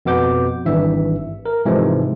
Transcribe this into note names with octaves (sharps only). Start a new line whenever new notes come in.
F2 B2 B3 D6 G6
G#1 G2 E3 E5
A#4
G#2 C3 E3 F3 G#3 A3